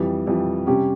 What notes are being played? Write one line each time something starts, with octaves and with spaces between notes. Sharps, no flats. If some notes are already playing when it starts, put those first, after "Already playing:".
Already playing: F2 E3 G3
F2 E3 G3
C3 G3 C#4 G4